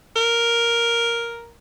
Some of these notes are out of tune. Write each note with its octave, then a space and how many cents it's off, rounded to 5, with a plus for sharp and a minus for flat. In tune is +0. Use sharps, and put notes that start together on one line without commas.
A#4 +5